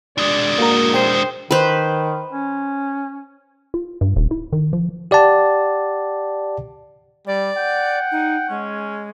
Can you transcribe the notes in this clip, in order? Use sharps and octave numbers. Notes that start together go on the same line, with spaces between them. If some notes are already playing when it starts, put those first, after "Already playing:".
G#3 D4 D5
A#3 F#4 A#4
C5 G5
D#3 B4 C5
C#4
F4
G2
D#1
E4
D#3
F3
G4 D5 F#5 A5
G3 D5
F#5 G5
D#4
G#3 C#4